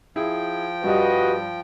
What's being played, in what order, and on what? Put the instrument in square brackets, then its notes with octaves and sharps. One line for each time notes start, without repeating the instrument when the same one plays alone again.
[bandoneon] F3 G5 [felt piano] E4 G#4
[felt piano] G2 G3 [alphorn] F#4 [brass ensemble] G4 B4 D#5